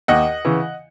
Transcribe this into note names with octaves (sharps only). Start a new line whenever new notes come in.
D#2 D#5 F#5
C#3 E3